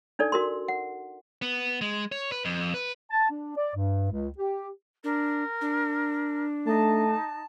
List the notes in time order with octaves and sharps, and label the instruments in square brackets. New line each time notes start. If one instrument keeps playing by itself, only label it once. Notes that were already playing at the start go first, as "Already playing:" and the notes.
[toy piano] D4 D#4 A4 D5
F#4 A#4 C6
F#5
[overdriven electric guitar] B3
G#3
C#5
B4
F2
B4
[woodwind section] A5
D4
D5
G2
C#2
G4
[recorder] D4 [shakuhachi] A#4
[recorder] D4
[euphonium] A3 [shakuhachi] D#4 [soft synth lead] A5